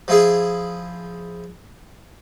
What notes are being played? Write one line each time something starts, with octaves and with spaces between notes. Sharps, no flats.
F3 E4 G#4